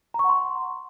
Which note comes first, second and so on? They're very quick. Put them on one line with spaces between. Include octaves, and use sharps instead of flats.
A#5 C#6 F#5 C6